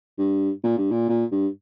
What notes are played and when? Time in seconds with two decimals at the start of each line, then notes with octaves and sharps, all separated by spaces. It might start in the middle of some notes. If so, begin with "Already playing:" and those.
0.18 G2
0.63 A#2
0.78 G2
0.91 A#2
1.09 A#2
1.31 G2